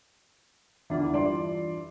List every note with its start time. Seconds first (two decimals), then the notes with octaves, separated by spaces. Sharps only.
0.90 E2 D3 E3 D4 F4
1.12 G2 D5 C6